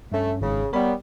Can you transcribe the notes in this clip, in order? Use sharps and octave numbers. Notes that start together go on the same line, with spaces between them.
G2 A3 C#4
G#1 G#2 C#3
G3 B3 A#4 C#5 B5